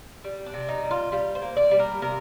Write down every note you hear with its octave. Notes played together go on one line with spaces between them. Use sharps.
G3
D4
C3
D#4
G3
F4
G3 F4
C5
A#3
D5
G3
A#4
C3 A#4